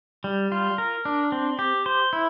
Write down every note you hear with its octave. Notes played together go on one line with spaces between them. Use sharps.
G3
F4
A#4
D4
C4
G4
C5
E4